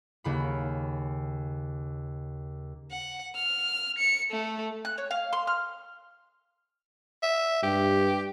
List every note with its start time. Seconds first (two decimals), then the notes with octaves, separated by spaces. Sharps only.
0.24 D#2 C#3 B5
2.91 F#5
3.36 F6
3.98 C#7
4.31 A3
4.85 F#6
4.98 C#5
5.11 F5
5.33 C6
5.47 F6
7.23 E5
7.63 G2 G4